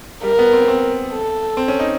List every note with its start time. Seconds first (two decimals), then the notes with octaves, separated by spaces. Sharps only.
0.23 G3 A#4
0.39 B3
0.53 C4
0.68 C4
1.12 A4
1.57 C4
1.68 C#4
1.80 D#4